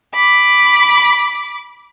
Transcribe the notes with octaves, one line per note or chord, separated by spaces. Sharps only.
B5 D6